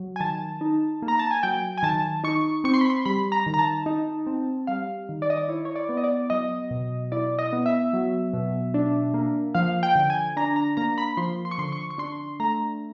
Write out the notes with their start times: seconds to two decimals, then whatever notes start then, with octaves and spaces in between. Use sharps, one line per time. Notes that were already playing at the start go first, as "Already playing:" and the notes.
Already playing: F#3
0.16 G#5
0.20 D#3 A5
0.61 D#4
1.02 A#3
1.08 A#5
1.19 A5
1.31 G#5
1.43 F#3 G5
1.78 G#5
1.83 D#3 A5
2.24 D#4 C#6
2.64 C4 C#6
2.74 C6
2.81 B5
2.90 C6
3.05 G3 B5
3.32 A#5
3.46 D#3
3.54 A#5
3.59 A5
3.86 D#4
4.26 C4
4.67 G3 F5
5.09 D#3
5.22 D5
5.30 D#5
5.37 D5
5.48 E4 C#5
5.65 C#5
5.76 D5
5.89 B3
5.97 D#5
6.04 D5
6.30 F#3 D#5
6.71 B2
7.12 E4 D5
7.39 D#5
7.53 B3
7.66 E5
7.93 F#3
8.33 B2
8.74 D4
9.14 A#3
9.55 F3 F5
9.83 G5
9.95 D3
10.10 G#5
10.37 D4 A#5
10.56 A#5
10.77 A#3 A#5
10.98 B5
11.17 F3 C6
11.45 C6
11.51 C#6
11.58 D3 C6
11.72 C#6
11.90 C#6
11.98 D4 C6
12.40 A3 A#5